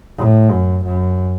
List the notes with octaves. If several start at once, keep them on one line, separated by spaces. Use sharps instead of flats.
A2
F#2
F#2